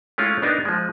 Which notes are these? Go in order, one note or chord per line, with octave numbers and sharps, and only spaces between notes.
G#3 A3 C#4 E4 F4
B3 D4 D#4 G4 A#4
F3 G#3